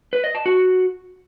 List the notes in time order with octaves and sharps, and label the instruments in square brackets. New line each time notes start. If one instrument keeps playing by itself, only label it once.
[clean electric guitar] B4
D#5
A5
F#4